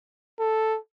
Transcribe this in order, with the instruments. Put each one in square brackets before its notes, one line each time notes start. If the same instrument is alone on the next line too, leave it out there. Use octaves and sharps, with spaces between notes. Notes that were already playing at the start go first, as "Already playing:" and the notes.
[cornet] A4